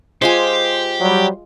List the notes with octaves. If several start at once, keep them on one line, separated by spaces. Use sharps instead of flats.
G#3 F4 G4 C5 G#5
F#3 G3